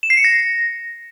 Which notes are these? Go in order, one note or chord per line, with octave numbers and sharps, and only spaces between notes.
E7
C7
C#7
A#6